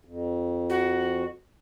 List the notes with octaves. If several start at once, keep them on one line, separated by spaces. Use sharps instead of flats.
F2
F#4